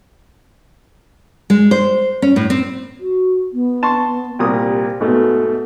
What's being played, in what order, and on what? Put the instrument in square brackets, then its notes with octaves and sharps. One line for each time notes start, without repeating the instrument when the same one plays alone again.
[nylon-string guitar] G#3
C5
C#4
A2
C4
[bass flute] F#4
B3
[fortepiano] A5 C6 C#6
[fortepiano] C2 A#2 D#6 [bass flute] G4
[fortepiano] G#2 B2 A3 [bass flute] B3